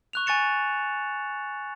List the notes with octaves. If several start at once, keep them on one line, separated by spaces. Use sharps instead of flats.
C#6 F#6 F7
G#5 C#6 A6 C#7 E7